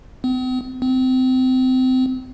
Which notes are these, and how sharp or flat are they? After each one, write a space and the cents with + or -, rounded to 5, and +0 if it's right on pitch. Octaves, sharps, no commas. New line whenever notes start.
C4 -45
C4 -25